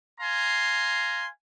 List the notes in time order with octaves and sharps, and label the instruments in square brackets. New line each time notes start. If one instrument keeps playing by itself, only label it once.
[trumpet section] F5 G#5 A#5 C6